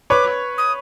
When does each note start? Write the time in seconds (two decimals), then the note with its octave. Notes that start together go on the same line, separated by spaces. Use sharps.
0.10 B4 C#5 D6
0.58 D#6